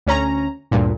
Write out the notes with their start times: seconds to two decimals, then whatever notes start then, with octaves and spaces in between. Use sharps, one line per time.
0.07 D2 C#4 A#5
0.71 D2 G2 A#2